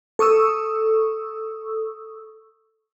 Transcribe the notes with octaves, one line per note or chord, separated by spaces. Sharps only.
A4 C#6 D#6 E6